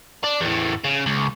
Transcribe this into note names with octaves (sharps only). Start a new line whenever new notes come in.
D4
E2 A2
C#3
C#2